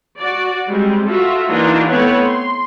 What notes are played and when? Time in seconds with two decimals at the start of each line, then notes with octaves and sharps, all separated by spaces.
0.18 F#4 D5
0.68 G3 G#3 C4
1.07 F4 F#4 A4 E5
1.48 E3 A#3 D4 D#4 F4 F#4
1.89 A3 B3 C4 B4 C#5
2.25 C6